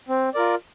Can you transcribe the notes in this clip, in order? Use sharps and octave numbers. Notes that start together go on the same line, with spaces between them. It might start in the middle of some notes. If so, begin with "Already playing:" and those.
C4
F4 A#4 D5